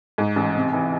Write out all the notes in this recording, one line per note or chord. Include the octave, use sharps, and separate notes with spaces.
G#2
A1
C3
E3